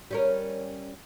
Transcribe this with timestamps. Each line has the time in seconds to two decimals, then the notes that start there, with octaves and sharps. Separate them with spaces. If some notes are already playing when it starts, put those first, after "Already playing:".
0.11 G3 C#4 A#4